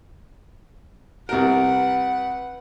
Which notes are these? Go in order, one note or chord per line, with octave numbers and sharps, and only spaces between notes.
C2 A#4 B4 F#5